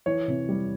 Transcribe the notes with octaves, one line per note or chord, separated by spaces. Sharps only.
E3 C#5
C3
G3